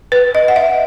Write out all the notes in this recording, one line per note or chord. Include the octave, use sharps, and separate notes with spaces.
B4
D#5
F#5
E5